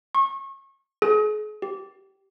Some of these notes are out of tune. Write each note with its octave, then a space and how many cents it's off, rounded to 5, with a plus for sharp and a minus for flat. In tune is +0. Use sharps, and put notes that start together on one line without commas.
C#6 -30
G#4 +40
G4 -15